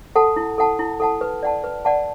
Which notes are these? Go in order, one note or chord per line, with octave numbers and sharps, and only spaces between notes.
A4 F#5 A5
E4
A4 F#5 A5
E4
A4 F#5 A5
B4
D5 F#5 A5
B4
D5 F#5 A5